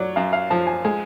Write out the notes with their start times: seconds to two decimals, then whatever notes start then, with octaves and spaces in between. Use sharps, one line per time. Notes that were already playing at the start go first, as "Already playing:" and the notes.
Already playing: F#3 C#5 D5
0.16 F#2 F5
0.33 F5
0.50 F3 A5
0.67 G#5
0.85 G#3 G#5